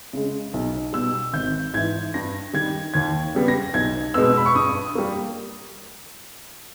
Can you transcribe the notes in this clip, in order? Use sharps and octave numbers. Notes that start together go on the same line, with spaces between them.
C#3 G#3
B1
B2 G3 E6
G#1 G6
G#2 E3 G#6
G2 A#6
D#3 G3 G#6
D#2 G#6
C#3 G3 B3
A#6
B1 G#6
B2 G#3 B3 E6
B5
C#6
G2 D#6
G3 A#3